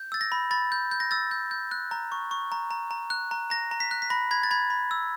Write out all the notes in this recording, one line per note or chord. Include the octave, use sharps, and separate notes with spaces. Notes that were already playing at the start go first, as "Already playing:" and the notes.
Already playing: G6
E6 A6
A#6
B5
B5 A6
G6
G6
A#6
E6 A6
G6
G6
F#6
A#5
C#6
C#6
A#5
A#5
A#5
F#6
A#5
A#5 A#6
A#5
B6
F#6
B6
B5 A#6
B5 G#6
A6
B5 G#6
B5
E6